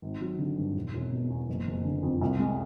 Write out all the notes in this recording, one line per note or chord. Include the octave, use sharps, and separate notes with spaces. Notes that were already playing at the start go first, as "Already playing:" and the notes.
G#1
F#3
D3
G2
E1
E1
B2
E2
F#1
F#1
D3
F2
C2
G#3